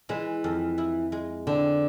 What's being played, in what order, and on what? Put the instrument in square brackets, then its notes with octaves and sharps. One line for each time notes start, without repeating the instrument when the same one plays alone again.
[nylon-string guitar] E3 [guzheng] G#3
[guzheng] F2
E4
G#3
[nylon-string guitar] D3 [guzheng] C4